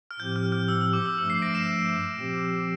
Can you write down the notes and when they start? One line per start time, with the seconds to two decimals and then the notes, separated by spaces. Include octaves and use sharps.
0.11 F6
0.19 A2 F3 C4 G4 G6
0.36 F6
0.52 F6
0.68 E6
0.81 E6
0.93 D6
1.06 E6
1.17 G2 F3 A3 E6
1.30 C7
1.42 A#6 D7
1.54 C7 E7
2.16 A#2 F3 C4 G4